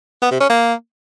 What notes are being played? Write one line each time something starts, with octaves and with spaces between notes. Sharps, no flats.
B3
C3
C#4
A#3